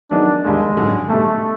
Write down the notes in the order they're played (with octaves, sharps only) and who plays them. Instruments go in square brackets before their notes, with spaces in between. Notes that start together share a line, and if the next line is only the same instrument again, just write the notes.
[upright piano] D#3 F#3 B3 D#4 G#4 [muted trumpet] D4
[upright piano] E1 D#2 D3 G3 A#3 [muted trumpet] G#3
[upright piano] A1 G2 D3 F#3
[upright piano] B1 B2 G3 [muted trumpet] A3